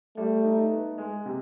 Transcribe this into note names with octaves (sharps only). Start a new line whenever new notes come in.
G3 A3
D#4
B3
G#3
C3